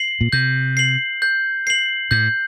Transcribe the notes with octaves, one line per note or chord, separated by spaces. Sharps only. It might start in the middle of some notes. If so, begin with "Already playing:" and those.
Already playing: C7 F#7
A#2
C3 G6
C7 F#7
G6
C7 F#7
A2 G6